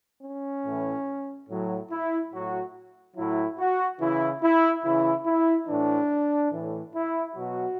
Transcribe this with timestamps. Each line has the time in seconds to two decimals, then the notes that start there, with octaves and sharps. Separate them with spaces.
0.23 C#4
0.65 A2 E3
1.50 A2 F#3
1.91 E4
2.33 A2 F#3 F#4
3.17 A2 F#3 E4
3.59 F#4
4.00 C#3 E3 E4
4.42 E4
4.84 C#3 E3 E4
5.26 E4
5.68 A2 E3 D4
6.52 A2 E3
6.94 E4
7.35 B2 F#3 F#4